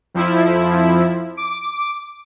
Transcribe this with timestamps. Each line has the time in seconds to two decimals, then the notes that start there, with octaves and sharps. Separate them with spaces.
0.14 F2 F3 E4
1.37 D6